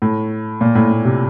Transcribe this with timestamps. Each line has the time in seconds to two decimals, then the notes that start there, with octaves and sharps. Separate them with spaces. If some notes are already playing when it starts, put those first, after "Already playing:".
0.02 A2
0.61 A#2
0.75 A2
0.90 A#2
1.05 C3